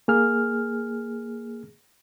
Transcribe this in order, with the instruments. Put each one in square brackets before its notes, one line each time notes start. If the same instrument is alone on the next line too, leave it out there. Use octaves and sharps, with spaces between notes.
[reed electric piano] A#3 G#4 F6